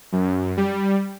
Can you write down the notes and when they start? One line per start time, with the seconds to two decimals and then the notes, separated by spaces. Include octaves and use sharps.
0.12 F#2
0.57 G3